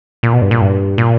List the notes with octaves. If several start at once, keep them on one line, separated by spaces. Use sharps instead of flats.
A#2
B2
G2
A#2
G2
A#2